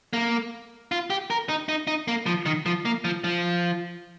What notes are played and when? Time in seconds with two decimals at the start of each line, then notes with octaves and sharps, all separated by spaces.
0.13 A#3
0.92 F4
1.10 G4
1.30 A#4
1.49 D#4
1.69 D#4
1.87 D#4
2.08 A#3
2.26 F3
2.46 D#3
2.66 F3
2.85 A#3
3.04 F3
3.24 F3